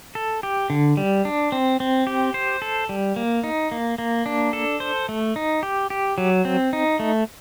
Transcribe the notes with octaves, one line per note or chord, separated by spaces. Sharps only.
A4
G4
D3
G3
D4
C4
C4
G4
C5
A4
G3
A#3
D#4
A#3
A#3
D4
A4
C5
A3
D#4
G4
G4
F#3
C4
D#4
A3